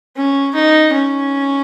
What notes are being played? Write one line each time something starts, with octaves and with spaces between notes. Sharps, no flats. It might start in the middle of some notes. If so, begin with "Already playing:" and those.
C#4
D#4
C#4